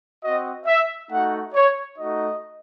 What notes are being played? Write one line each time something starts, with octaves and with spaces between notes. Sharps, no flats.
C4 F#4 D#5
E5
A3 D#4 F#4 F#5
C#5
A3 D#4 F#4 D#5